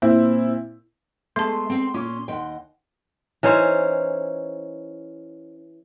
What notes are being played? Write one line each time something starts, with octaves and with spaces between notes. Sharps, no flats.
A#2 C4 E4
G#3 A3 B3 A4 A5 C6
C4 G5
A#2 C#4 D6
D#2 D#5 F#5 G5
E3 C#4 D#4 C5